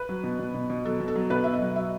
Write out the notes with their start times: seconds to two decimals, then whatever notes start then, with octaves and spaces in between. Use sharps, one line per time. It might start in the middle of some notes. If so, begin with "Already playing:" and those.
Already playing: B4
0.09 F#3
0.24 B2
0.39 B2
0.54 B2
0.70 B2
0.85 F#3 A4
1.00 B2
1.08 A4
1.15 F#3
1.30 B2 B4
1.44 B2 E5
1.53 D#5
1.62 F#3
1.76 F#3 E5